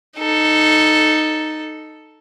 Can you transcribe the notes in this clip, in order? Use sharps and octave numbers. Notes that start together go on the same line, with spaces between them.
D#4 A4